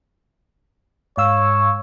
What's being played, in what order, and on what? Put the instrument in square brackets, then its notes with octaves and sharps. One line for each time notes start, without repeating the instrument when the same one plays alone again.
[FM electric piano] G#2 F5 E6 [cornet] C#5